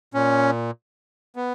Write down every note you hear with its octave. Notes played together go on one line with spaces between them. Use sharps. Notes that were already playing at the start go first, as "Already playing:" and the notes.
A#2 C#4
B3